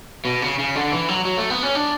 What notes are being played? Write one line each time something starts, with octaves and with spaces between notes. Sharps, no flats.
B2
C#3
C#3
D3
E3
F#3
F#3
A3
B3
C#4
D4